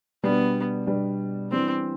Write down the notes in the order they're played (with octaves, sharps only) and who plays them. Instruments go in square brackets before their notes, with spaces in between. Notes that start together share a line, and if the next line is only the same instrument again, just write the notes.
[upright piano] B2 G3 D4 [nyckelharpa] B3
[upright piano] B2 G3 D4
[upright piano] E3 G3 D4 [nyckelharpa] C4